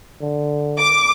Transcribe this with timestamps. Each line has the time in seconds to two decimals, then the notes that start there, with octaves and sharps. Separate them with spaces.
0.21 D3
0.78 D6